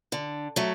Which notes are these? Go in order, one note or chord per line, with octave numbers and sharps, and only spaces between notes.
D3
F#3 A3